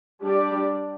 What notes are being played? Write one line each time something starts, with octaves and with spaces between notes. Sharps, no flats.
G3 D4 G4 D5